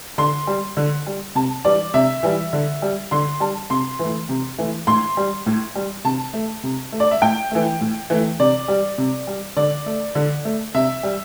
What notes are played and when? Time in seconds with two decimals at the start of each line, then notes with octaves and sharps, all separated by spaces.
0.18 D3 C6
0.47 G3
0.77 D3
1.06 G3
1.35 C3 A5
1.65 E3 G3 D5
1.94 C3 E5
2.23 E3 G3
2.53 D3
2.82 G3
3.11 D3 C6
3.40 G3 A5
3.70 C3 C6
3.99 E3 A3
4.29 C3
4.58 E3 A3
4.87 A2 C6
5.17 G3
5.46 A2
5.75 G3
6.04 C3 A5
6.34 A3
6.63 C3
6.92 A3
7.00 D5
7.11 E5
7.22 A2 G5
7.51 E3 A3
7.81 A2
8.10 E3 A3
8.39 C3 D5
8.68 G3
8.98 C3
9.27 G3
9.56 D3 D5
9.86 A3
10.15 D3
10.45 A3
10.74 C3 E5
11.03 G3